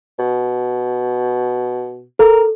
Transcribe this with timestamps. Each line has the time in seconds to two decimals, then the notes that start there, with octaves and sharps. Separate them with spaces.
0.19 B2
2.19 A4 A#4